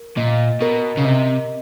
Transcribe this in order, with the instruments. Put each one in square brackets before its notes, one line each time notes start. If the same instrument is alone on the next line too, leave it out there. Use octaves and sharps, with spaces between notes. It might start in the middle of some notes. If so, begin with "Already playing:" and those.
Already playing: [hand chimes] A#4
[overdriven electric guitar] A#2 [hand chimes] D#5
[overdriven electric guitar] B2 [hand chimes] A#4
[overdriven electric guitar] C#3
[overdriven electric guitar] C3 [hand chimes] D#5